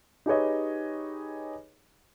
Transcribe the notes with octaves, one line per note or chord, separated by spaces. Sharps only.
D#4 G4 G#4 B4 C#5 D#5